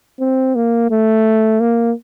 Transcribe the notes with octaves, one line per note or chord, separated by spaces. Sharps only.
C4
A#3
A3
A#3